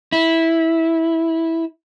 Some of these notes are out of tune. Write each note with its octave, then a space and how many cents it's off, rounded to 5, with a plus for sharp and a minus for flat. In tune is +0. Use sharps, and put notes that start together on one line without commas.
E4 -10